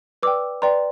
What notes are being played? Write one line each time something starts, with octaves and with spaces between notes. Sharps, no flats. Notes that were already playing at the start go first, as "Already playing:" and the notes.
B4 D5 G5 D6 E6
B4 D5 G5 A#5 C6